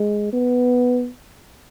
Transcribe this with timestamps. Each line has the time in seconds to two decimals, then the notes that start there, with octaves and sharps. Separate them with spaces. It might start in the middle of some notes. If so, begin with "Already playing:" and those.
Already playing: G#3
0.33 B3